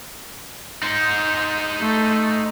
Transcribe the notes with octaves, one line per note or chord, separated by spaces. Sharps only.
D#4 C5
A3